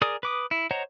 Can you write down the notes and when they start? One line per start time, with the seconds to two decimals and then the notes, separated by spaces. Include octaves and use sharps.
0.02 G#4 A#4 D5 D#6
0.23 B4 D6 D#6
0.51 E4
0.71 C5 C#5 D#5 F#5 A#5